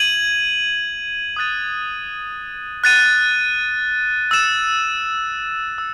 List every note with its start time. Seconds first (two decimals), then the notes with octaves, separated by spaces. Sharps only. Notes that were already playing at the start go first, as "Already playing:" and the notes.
Already playing: G#6 D#7 F#7
1.36 D#6 F#6 A6 D#7
2.84 F#6 A6 D#7
4.31 E6 A6 E7
5.78 E6